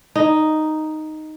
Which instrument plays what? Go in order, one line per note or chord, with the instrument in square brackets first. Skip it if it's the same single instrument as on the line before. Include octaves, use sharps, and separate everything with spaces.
[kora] D#4